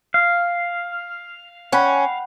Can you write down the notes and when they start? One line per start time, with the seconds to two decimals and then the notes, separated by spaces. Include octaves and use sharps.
0.14 F5
1.73 C#4 F#5 G5 B5